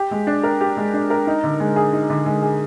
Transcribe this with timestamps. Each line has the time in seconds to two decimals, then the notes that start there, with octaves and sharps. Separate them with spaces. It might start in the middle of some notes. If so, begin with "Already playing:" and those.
Already playing: G4
0.11 G#3
0.27 D4
0.43 A#4
0.61 G4
0.77 G#3
0.94 D4
1.10 A#4
1.27 D#4
1.44 D3
1.60 G#3
1.76 G#4
1.93 D#4
2.10 D3
2.26 G#3
2.42 G#4